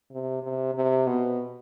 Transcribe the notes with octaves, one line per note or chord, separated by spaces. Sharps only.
C3
C3
C3
B2